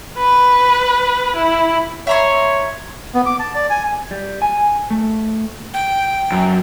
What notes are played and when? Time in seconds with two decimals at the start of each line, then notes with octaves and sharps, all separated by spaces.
0.18 B4
1.36 E4
2.07 C#5 E5 A#5 C6
3.15 B3
3.26 D6
3.39 A5
3.55 D5
3.70 G#5
4.11 G3
4.42 G#5
4.90 A3
5.74 G5
6.32 F#2